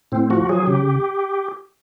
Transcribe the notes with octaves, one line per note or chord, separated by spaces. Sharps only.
A2 C4
F3 F#4
F#3 G#4
C#3 G4